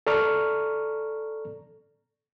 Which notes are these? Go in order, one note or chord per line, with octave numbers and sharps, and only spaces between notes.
A4 D5 A#5 C#6 F6